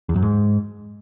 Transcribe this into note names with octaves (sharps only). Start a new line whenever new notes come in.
E2
F#2
G#2